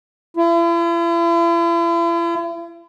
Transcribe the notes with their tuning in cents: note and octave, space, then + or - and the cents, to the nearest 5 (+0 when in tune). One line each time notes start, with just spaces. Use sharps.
E4 +45